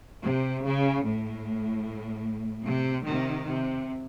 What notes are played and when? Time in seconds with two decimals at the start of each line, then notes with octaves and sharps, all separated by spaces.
0.24 C3
0.65 C#3
1.05 A2
2.66 C3
3.05 C3 D#3
3.46 C3